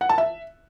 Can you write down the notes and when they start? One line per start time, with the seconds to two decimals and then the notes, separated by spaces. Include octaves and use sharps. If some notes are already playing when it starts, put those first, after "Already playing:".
0.01 F#5
0.09 A5
0.18 E5